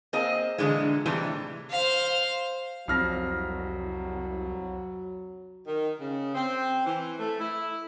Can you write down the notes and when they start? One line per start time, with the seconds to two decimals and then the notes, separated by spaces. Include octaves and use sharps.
0.13 A#3 C4 G#4 D#5
0.58 A#2 D3 E3 G#3
1.06 A2 C3 E3 G3 A3
1.71 C5 F5
2.88 C2 F2 F#3 F6 A#6
5.66 D#3
6.00 C#3
6.35 C4
6.84 E3
7.18 A3
7.39 E4